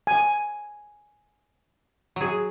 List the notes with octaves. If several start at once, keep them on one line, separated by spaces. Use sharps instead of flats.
G#5
F#3 G#4